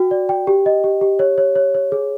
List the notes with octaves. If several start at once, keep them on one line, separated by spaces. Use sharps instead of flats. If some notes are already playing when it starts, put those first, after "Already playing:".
Already playing: F#4 G5
D5
G5
G4
D#5
G4
G4
C#5
C#5
C#5
C#5
G#4